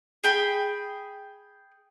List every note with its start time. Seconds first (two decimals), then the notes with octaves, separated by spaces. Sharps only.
0.24 G#4 G5 B5